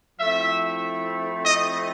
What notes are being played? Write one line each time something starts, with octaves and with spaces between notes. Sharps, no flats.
F3 A3 C4 E4 E5
D#5